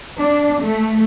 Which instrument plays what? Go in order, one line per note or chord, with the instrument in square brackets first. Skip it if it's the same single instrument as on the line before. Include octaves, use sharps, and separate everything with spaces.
[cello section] D4
A3